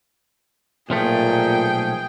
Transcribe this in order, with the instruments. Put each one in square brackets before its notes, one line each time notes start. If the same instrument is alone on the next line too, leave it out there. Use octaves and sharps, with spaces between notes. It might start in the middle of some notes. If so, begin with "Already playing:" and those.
[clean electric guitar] B1 F3 A3 [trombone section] A#2 [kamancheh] G#4 G5